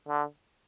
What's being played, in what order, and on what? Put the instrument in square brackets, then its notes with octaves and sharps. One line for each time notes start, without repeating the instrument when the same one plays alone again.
[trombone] D3